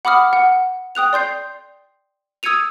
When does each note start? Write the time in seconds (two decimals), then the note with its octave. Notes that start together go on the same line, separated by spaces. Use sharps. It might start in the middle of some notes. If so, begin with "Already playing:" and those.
0.05 F#5 B5 D6 D#6 F6
0.33 F#5
0.95 G5 D#6 F#6 F7
1.13 D5 C6 G6 C7
2.43 D#6 E6 G#6 C#7 D#7 F7